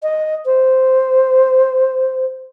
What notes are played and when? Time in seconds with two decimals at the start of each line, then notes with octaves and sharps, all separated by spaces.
0.03 D#5
0.45 C5